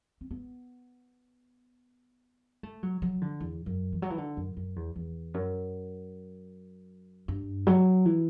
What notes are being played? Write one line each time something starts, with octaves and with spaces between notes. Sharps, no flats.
C4
B3
A3
F#3
F#3
D3
E2
F#2
E3
F#3
E3
D3
F#2
F#2
E2
E2
F#2
G2
F#3
E3